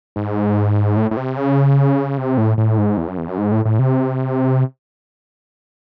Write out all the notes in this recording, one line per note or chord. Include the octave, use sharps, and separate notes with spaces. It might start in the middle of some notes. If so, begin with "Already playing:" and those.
G#2
A2
A2
C3
C#3
C3
A2
A2
G#2
E2
F#2
E2
F#2
G#2
A2
A2
C3